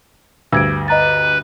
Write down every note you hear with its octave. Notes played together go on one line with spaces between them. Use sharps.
D2 G2 E6 G#6 D7
B4 D#5 A#5 A6